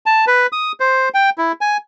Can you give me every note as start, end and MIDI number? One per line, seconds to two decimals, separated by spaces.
0.06 0.25 81
0.27 0.47 71
0.52 0.72 87
0.80 1.09 72
1.14 1.30 79
1.38 1.52 64
1.61 1.77 80